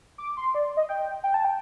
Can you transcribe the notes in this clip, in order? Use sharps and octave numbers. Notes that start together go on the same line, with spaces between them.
D6
C6
D5
D#5
G5
G5
A5
G5